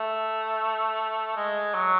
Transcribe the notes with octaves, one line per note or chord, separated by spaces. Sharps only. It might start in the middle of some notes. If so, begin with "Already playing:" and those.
Already playing: A3
G#3
F#3